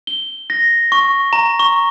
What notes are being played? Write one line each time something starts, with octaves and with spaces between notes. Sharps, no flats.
G7
A#6
C#6
A#5
C#6